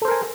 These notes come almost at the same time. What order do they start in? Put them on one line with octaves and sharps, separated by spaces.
A4 C5 A#4 G#5